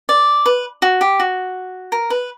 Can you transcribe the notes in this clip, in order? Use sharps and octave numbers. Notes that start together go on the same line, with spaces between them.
D5
B4
F#4
G4
F#4
A#4
B4